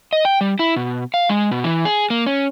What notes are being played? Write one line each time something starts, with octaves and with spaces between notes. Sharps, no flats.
D#5
G5
G3
E4
B2
F5
G#3
B2
E3
G#4
A#3
C#4